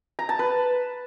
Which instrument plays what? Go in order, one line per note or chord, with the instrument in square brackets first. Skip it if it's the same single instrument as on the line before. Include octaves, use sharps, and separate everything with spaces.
[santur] A#5
A5
B4